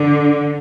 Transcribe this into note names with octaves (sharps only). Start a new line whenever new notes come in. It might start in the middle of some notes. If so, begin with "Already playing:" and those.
Already playing: D3